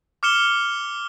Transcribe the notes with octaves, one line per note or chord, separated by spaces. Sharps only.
D6 F6 C#7 E7 G7